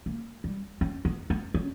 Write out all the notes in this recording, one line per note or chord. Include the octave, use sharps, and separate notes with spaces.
A#3
G3
C#4
B3
B3
C#4